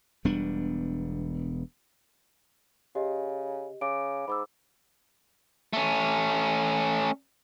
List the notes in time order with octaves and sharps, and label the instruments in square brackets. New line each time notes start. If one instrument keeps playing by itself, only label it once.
[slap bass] E1 G3 B3 D4
[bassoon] C#3 [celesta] G4 D#5
[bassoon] C#3 [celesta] D6 D7
[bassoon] G#2 [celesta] B5 D6 E6
[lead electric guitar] A3 C#4